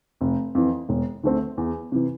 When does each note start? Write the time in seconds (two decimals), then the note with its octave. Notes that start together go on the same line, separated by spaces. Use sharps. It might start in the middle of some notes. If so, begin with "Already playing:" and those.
0.21 F1
0.55 F2 E3
0.89 E1
1.23 D2 D3 A3 C4
1.57 E2
1.92 C3 E3